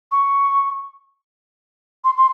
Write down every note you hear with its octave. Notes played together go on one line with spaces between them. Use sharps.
C#6
C6
C6